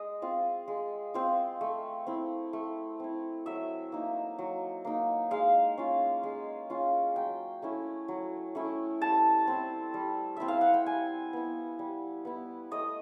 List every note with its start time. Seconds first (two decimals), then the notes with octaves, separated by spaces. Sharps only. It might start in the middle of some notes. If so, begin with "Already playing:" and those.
Already playing: G#3 D#5
0.22 C4 F4
0.68 G#3
1.14 C4 F4
1.61 A3
2.07 C4 E4
2.53 A3
3.00 C4 E4
3.46 F#3 E5
3.92 A#3 D#4
4.39 F#3
4.85 A#3 D#4
5.31 G#3 F5
5.78 C#4 F4
6.23 G#3
6.70 C#4 F4
7.16 F#3 G5
7.62 A3 C#4 E4
8.08 F#3
8.55 A3 C#4 E4
9.01 G3 A5
9.47 C4 E4
9.94 G3
10.36 C4 E4 E5
10.48 F5
10.61 F#5
10.74 G5
10.86 G3 G#5
11.33 B3 E4
11.79 G3
12.25 B3 E4
12.71 A3 D#5